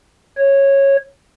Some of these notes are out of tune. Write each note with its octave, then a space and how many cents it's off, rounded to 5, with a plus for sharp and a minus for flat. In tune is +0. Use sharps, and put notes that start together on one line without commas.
C#5 -10